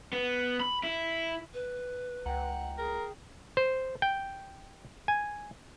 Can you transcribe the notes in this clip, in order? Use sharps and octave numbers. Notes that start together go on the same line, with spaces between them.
B3
B5
E4
B4
C#2 F#5 G5 A#5
G#4 A#4
C5
G5
G#5